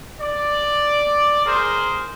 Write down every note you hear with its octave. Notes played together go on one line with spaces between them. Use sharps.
D5
G#4 A#4 C5